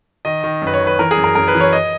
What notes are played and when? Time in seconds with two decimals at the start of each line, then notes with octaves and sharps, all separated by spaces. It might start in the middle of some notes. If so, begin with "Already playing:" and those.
0.25 D#3 D#5
0.44 D#3
0.62 F#2 B4
0.74 C#5
0.81 D#3
0.87 B4
0.99 E3 A#4
1.11 G#4
1.17 F#2
1.24 A#4
1.35 F#2 A#4
1.48 B4
1.55 E3
1.61 C#5
1.73 D#5